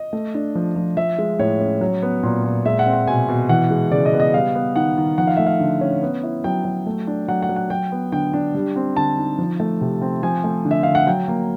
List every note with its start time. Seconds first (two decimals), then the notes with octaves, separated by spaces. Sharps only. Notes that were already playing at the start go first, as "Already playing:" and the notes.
Already playing: D#5
0.13 A3
0.34 D4
0.55 F3
0.76 F3
0.97 F3 E5
1.18 G#3
1.39 A2 C#5
1.60 C#4
1.81 F#3
2.02 B3
2.23 A#2
2.44 A#2
2.65 G#3 E5
2.79 F#5
2.86 C4
2.93 F#5
3.07 B2 G#5
3.29 B2
3.49 E3 F#5
3.71 G#3
3.91 C#3 D5
4.06 D#5
4.13 B3
4.20 D#5
4.34 G3 F5
4.55 B3
4.76 D#3 F#5
4.97 D#3
5.18 F3 F#5
5.27 F5
5.37 A3 E5
5.47 F5
5.60 D3
5.81 C#4
6.03 B3
6.23 E4
6.44 F#3 G5
6.65 F#3
6.87 A3
7.07 D4
7.28 F#3 F#5
7.42 F#5
7.49 F#3
7.56 F#5
7.70 F#3 G5
7.92 B3
8.12 D3 G5
8.33 D4
8.55 G3
8.76 C4
8.96 D3 A5
9.18 D#4
9.38 F3
9.60 A3
9.81 C3
10.02 C4
10.23 F3 G#5
10.44 A3
10.65 D3
10.71 E5
10.83 D3 F5
10.95 F#5
11.07 F#3 G5
11.28 A#3